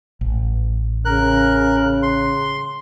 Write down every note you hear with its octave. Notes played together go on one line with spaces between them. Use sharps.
A1
C#3 A#4 F#6
C6